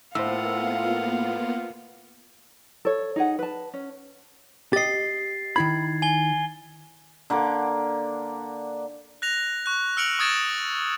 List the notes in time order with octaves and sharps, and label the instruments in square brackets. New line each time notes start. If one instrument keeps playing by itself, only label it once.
[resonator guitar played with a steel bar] A2 [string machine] A#3 B3 F4 [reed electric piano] C5 E6 [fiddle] F5 F#5
[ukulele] A4 C#5
D#4 G#4 F#5
B4 A5
C#4
[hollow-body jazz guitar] G4 D#5 [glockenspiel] A6 C7
[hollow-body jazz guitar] D#3 E4 B5 [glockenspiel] G#6
[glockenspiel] G#5 G7
[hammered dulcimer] D3 A#3 F#5 D6
[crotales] F#6 A#6 F7
C#6 F#6
E6 F6 C#7 D7 F7 F#7
C#6 D#6 G#6 A6 D7 E7